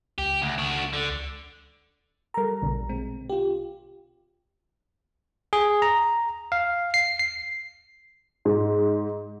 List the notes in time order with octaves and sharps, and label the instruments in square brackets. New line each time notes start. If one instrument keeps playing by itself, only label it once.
[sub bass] C#2 [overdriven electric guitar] G4
[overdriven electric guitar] D2
D4 F#4
D3
[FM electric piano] G3 A#5 [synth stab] A4 A#4
[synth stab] A#1 B2 D3
[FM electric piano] G#3 C4
F4 G4
[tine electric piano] G#4
A#5
F5
C7
C7
[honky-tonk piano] G#2